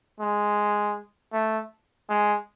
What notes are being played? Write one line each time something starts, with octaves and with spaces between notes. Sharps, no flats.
G#3
A3
G#3